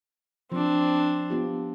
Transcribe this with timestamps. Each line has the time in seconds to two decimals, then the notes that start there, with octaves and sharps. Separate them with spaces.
0.52 F3 C4 D4
1.30 B3 F4 G4